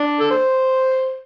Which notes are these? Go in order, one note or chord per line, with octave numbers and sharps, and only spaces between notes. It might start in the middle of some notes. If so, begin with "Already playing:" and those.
Already playing: D4
A4
C5